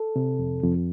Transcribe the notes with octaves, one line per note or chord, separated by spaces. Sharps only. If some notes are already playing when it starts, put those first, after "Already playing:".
Already playing: A4
C3
F2
F2